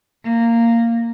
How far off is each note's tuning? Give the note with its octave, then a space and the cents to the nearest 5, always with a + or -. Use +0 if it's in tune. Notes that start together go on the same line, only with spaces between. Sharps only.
A#3 -10